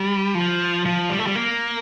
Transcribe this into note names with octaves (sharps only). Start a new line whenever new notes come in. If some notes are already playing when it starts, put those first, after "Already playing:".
Already playing: G3
F3
F3
G3
A3
G3
A#3